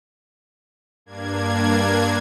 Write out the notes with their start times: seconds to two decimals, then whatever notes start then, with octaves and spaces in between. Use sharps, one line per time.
1.06 G2 A#3 D4 G#6